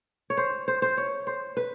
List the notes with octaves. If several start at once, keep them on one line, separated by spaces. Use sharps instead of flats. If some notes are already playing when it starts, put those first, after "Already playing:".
C#5
C5
C5
C5
C#5
C5
B4